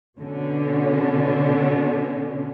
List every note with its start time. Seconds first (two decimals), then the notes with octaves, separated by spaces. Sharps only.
0.19 B2 D3 C#4